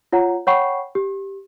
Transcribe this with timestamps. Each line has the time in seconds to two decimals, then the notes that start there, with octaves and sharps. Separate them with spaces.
0.12 F4 C#5 F#5 A#5
0.47 C#5 F#5 G5 B5 C#6 C7
0.95 G4